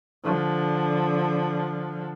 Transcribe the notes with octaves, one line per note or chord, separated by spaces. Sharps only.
D3 F3